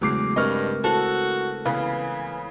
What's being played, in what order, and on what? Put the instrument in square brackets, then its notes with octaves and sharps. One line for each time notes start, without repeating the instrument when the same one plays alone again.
[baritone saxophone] E2 [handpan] C#3 G#3 A3 [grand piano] F#3 D6 C7
[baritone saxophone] G2 [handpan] C4 A#4 B4 [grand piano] D#5 C#6 F6
[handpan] E4 A4 C5 [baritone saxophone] F#4 [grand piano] A5
[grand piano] C#3 B3 [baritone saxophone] E3 [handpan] F5